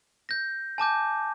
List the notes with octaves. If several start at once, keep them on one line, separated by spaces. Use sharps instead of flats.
G6 A#6
G#5 A5 D6 G6